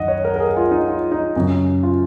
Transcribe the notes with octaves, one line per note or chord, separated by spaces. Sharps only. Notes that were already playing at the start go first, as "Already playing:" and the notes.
Already playing: F#2 D#3 D#5 F#5
C#5
A#4
A#4
G#4
F4
D#4
F4
D#4
F#2 C#3
F4